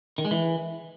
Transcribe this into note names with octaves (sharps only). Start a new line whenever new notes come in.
D#3
G#3
E3